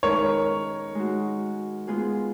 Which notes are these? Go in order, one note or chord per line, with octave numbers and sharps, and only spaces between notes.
D#3 G#3 C#4 A#4 C#5
G#3 D#4 F#4
G#3 B3 F4 G#4